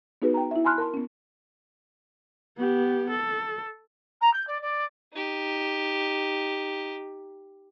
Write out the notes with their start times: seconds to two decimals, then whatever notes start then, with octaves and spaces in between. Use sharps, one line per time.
0.22 B3 D#4 F#4 G#4 B4
0.34 G5 A#5
0.51 E4 E5
0.64 G#5 A5 B5 C6 F6 F#6
0.78 A#4 A5 C6
0.94 B3 C#4
2.57 B3 G4
3.10 A4
4.21 A#5
4.33 G6
4.47 D5
4.61 D5
5.14 D#4 G4